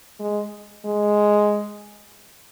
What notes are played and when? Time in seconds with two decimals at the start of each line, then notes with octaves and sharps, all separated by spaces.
0.20 G#3
0.85 G#3